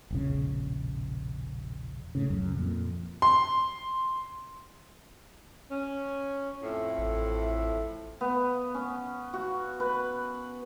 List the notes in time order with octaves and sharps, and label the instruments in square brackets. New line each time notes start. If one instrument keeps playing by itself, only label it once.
[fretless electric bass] E1 A#1 C#3
A2 C#3
C#2 F#2
F2 A#2
[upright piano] C6
[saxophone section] C#4
F2 A2 E4
[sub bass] A1
[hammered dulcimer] B3
C#4
F#4
B4